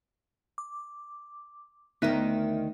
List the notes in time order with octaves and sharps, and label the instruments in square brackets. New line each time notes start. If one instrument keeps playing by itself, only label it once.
[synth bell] D6
[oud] D2 D#3 [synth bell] B3 D#4 E5